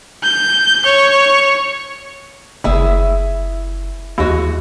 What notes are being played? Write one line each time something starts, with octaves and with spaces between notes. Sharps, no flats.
G6
C#5
F#1 E4 G#4 E5
D#2 E3 G#3 F#4